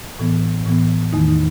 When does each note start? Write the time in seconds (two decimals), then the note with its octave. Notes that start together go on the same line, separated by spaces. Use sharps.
0.19 A2 E3 B3
0.66 A2 E3 B3
1.12 E2 D#3 A3 D#4
1.28 D#4